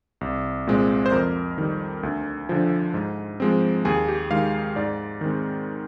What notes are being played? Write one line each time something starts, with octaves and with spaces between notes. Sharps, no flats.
C2
A#2 G#3 C4
C5
F2 A#4
D#3 G3
D2
D3 F3
G#2
F3 G#3 C4
D#2 G#4
G4
D#3 G#3 F5
G#2 D5
D#3 G#3 C4